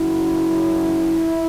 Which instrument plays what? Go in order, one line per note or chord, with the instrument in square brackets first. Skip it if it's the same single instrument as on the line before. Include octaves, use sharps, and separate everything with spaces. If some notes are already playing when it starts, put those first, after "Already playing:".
Already playing: [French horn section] F#2 C#3 F#3 E4